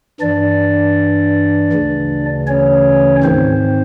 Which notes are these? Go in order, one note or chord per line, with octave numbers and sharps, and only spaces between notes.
G2 E3 D4 D5
D2 C#3 E3
C#4 C#5
G#2 D#3 C4 C5